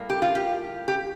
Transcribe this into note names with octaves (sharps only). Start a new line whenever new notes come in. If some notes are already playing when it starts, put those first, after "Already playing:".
Already playing: A2 G3 A#3
G4
F4
G4
G4